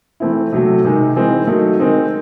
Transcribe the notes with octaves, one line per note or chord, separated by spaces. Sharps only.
E3 A3 C4 E4
C3 F#3 A3
C3 D#3 G#3 D#4
E3 G#3 C4 D#4
D#3 F#3 A3 D#4
D#3 G#3 C4 D#4